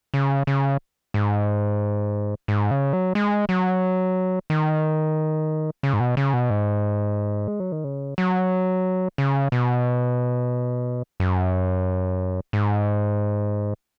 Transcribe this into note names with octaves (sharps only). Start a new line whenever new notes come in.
C#3
C#3
G#2
G#2
C#3
F#3
G#3
F#3
D#3
C#3
G#2
B2
C#3
B2
G#2
G#3
F#3
D#3
C#3
F#3
C#3
B2
F#2
G#2